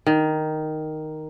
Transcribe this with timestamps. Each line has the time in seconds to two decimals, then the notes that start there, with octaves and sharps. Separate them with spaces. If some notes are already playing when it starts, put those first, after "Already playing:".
0.07 D#3